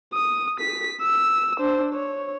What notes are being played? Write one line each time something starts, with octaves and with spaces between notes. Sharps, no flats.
D#6
B6
E6
D4 C5
C#5